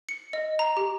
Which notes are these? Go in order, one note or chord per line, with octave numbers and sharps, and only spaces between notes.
C#7
D#5
A#5
G4